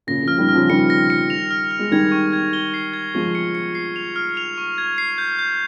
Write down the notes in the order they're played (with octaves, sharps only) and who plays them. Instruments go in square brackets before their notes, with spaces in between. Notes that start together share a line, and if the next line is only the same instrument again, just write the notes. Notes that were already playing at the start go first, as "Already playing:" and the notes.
[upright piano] A#2 C#3 [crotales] A#6
[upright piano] C#3 F3 [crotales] F6
[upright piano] D#3 G3
[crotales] F6
[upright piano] C#3 F3
[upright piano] D#3 G3 [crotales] C#7
[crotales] A#6
C#7
F7
F6
F6
[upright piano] G#3
[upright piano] D#3 G3 [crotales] G#6
[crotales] C#6
G#6
G7
C7
G#6
[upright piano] F3 G#3 [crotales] C#6
[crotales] C#7
C#7
C7
F7
F6
F7
C#6
G#6
C7
G6
G6